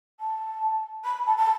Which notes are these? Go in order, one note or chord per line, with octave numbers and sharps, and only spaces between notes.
A5
B5
A5
A5